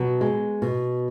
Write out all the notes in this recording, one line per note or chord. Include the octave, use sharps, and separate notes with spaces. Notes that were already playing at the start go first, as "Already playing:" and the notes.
Already playing: B2 F#3
G#3
B2